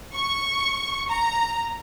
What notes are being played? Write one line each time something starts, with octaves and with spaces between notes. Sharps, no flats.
C#6
A#5